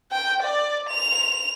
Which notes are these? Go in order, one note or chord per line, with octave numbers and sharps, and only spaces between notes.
G5
D5
F7